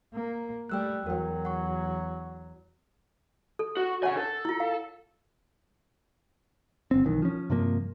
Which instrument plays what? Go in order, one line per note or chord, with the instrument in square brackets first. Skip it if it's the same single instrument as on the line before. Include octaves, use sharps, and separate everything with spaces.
[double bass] A#3
[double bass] G3 A3 [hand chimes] G5 E6 F#6
[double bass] E2 F#3 [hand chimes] A#4 G5
[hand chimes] F#5 C#6
[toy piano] A4
[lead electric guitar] F#4
[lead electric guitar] C#3 G#5 [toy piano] C#5 F#5
[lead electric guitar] A4
[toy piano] E4 F4
F5
[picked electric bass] G1 C4
B1 D#3 E3
F3 C#4
G2 C3 F3 A#3